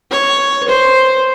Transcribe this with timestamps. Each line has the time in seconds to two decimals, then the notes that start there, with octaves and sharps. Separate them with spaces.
0.11 C#5
0.68 C5